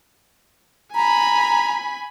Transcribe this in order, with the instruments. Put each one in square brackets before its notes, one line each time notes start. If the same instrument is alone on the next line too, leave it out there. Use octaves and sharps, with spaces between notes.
[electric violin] G#5 B5 [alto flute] A#5